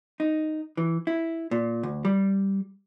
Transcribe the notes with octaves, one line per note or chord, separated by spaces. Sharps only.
D#4
E3
E4
A#2
D2
G3